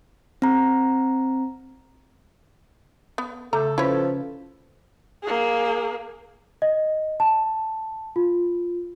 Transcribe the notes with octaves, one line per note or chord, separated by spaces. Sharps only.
C4 A#5
B3
C#3 A3 A4 A#5 D6 G6
F3 C#4 E4 B4 C#5
A#3 G#4
D#5
A5
F4